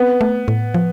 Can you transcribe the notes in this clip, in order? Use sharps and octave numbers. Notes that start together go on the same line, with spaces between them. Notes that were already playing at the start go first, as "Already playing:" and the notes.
Already playing: B3 C4
A3
A2
F3